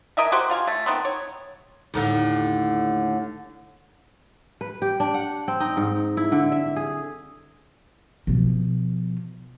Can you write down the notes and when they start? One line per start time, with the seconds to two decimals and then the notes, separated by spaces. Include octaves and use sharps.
0.17 A#4 D#5 E5 G#5
0.32 F#4 G4 C5
0.50 F4 F5 G#5
0.67 A3
0.86 D#3 B3 C4
1.05 C#5
1.94 D#2 A2 D3
4.61 B4
4.82 G4
5.00 D4
5.14 F#5
5.48 C4
5.60 D#4
5.77 G#2
6.17 E4
6.32 D3
6.52 E5
6.76 G#4
8.27 B2 F3